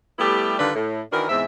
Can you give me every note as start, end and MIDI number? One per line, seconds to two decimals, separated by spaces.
0.19 0.58 55
0.19 0.58 57
0.19 0.58 59
0.19 0.58 64
0.19 0.58 67
0.59 0.70 50
0.59 0.70 51
0.59 0.70 55
0.59 0.70 62
0.59 0.70 65
0.59 0.70 71
0.75 1.01 45
1.12 1.26 51
1.12 1.26 52
1.12 1.26 62
1.12 1.26 66
1.12 1.26 70
1.29 1.44 40
1.29 1.44 44
1.29 1.44 56
1.29 1.44 60
1.29 1.44 76